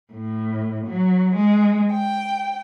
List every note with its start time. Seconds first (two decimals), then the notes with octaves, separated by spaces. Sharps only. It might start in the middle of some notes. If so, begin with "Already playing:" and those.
0.14 A2
0.87 F#3
1.37 G#3
1.92 G5